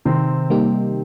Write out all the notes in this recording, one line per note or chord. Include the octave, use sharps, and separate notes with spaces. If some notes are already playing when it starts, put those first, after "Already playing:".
C3 D#3 C4
G3 A#3 D#4 G4